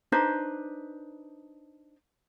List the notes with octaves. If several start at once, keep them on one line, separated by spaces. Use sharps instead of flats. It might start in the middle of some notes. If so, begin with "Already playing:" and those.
D4 D#4 B4 C5